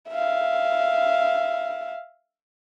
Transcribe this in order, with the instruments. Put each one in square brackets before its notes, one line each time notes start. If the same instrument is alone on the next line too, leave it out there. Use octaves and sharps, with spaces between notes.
[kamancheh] E5 F5